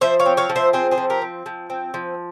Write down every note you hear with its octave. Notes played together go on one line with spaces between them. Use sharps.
F3 C5 E5
C#5 F5
C4
C#5 F5
F3
C5 E5
C4 G#4 C5
G#4 C5
F3
G4 A#4
C4
F3
C4
F3